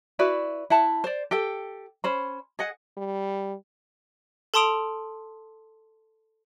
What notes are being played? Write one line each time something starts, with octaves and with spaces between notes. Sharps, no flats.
E4 F#4 B4 D5
E4 F#5 A5
C5 D5
G4 A4 G5
C#4 C5 B5
G#4 D#5 F#5
G3
A4 A5 C6 D#6 D7 F7